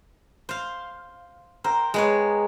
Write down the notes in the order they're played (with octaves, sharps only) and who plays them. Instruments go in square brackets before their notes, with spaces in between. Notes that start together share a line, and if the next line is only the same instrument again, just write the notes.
[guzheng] C5 F5
[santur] A#4 G5 A#5 [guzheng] C5
[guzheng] G#3 B3 C#5